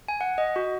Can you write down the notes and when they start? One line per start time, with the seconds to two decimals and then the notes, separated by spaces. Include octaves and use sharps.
0.08 G#5
0.21 F#5
0.38 D#5
0.56 F#4